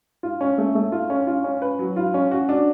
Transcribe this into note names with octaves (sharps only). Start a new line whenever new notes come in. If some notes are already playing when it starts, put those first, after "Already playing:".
F4
C#4
A3
A3
F4
C#4
F4
C#4
B4
F#3
F4
C#4
F#4
D4